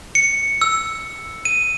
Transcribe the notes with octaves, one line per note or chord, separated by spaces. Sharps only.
C#7
E6
D#7